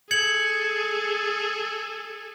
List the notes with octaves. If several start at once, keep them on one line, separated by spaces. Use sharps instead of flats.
G#4 A4 G#6 C#7 F#7